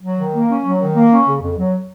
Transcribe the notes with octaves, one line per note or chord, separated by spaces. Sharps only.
F#3
D#3
A#3
C#4
F#3
D#3
A#3
C#4
C#3
F2
F#3